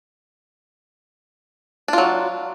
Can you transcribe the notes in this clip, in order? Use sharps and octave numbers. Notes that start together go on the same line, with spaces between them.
F#3 D4 F4